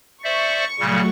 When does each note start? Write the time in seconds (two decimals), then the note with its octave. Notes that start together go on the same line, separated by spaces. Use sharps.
0.24 C5 D5 E5 C#6
0.80 A#2 C#3 F#3 G3 A3 F#4